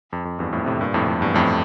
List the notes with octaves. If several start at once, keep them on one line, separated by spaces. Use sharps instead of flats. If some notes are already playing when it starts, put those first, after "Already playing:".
F2
F2
E2 G2
F2 A2
A2 C3
G2 A#2
F2 A2
F2 A2
E2 G2
F2 A2